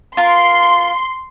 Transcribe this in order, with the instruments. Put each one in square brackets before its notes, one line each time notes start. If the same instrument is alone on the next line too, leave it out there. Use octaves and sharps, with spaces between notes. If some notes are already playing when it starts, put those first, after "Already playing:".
[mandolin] F4 A#4 [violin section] C6